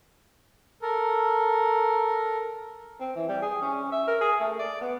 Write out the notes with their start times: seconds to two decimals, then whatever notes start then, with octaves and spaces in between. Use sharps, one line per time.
0.82 A4 A#4
3.00 C4
3.16 E3
3.29 G3
3.42 G#4
3.62 C#4
3.92 E5
4.07 A#4
4.21 G#4
4.40 A3
4.59 D5
4.81 B3